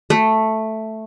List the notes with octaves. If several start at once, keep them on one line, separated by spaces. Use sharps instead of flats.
A3